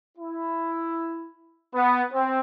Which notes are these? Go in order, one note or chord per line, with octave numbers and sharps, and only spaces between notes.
E4
B3
C4